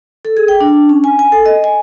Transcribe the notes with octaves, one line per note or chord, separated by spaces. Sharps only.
A4
G#4
G5
D4
C#4
G#5
G#5
A4
D#5
G#5